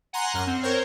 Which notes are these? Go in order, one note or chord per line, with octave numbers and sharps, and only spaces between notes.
F#5 G#5 A#5 C6
F#2 F6
C4
A#4 C5 C#5